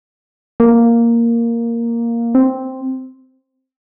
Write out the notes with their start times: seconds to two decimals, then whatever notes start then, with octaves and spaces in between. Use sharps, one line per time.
0.60 A#3
2.35 C4